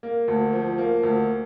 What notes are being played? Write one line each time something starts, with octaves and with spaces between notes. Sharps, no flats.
A#3
D2
F3
A#3
D2